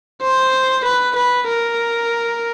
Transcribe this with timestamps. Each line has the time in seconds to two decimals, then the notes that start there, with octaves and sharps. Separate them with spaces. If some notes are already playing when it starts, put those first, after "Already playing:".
0.22 C5
0.84 B4
1.15 B4
1.47 A#4